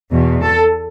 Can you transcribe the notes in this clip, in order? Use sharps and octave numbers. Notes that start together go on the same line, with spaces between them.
E2 B2
A4